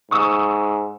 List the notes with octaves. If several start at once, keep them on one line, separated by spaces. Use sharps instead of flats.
G#2 C#6 D#6 E6